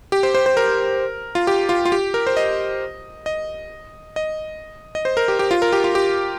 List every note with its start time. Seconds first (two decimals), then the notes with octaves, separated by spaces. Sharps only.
0.12 G4
0.23 C5
0.35 C5
0.46 C5
0.57 A#4
1.35 F4
1.47 G4
1.69 F4
1.85 F4
1.92 G4
2.14 A#4
2.27 C5
2.37 D#5
3.26 D#5
4.16 D#5
4.95 D#5
5.05 C5
5.17 A#4
5.28 G4
5.39 G4
5.51 F4
5.62 A#4
5.72 G4
5.84 F4
5.95 G4